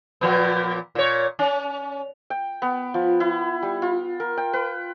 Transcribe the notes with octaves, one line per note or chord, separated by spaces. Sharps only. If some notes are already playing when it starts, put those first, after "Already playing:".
A#2 F3 B3
A#2 C#5
C#4
G5
B3
F3
E4
G3
F4
A#4
G5
B4